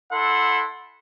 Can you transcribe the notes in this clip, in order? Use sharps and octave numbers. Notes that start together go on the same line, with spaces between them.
E4 A4 F#5 C6